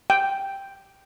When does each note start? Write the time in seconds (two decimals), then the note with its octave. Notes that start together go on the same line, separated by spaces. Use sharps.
0.10 G5